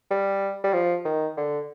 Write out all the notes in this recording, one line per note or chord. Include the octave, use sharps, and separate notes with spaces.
G3
G3
F3
D#3
D3